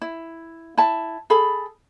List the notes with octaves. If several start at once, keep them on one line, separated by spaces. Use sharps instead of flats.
E4
E4 A5
G#4 A4 B5